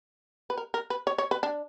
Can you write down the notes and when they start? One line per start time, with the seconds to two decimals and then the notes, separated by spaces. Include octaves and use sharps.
0.50 B4
0.58 A#4
0.74 A#4
0.90 B4
1.07 C#5
1.18 C#5
1.31 B4
1.43 D4